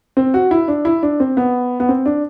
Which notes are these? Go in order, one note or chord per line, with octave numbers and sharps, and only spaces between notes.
C4
F#4
E4
D4
E4
D4
C4
B3
B3
C4
D4